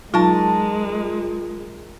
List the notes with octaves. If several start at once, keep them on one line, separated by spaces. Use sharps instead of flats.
F#3 G#3 D#4 F4 A#4 A5